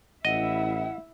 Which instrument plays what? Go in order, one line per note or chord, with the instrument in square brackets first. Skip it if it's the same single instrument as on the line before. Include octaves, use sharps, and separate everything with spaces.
[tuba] A1 [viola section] E4 E5 [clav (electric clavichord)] D#5 [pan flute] F#5